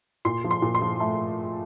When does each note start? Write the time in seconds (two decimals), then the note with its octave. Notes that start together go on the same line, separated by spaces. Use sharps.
0.25 A#2 C6
0.44 F3
0.51 C6
0.62 A#2
0.75 C6
0.81 F3
1.00 A3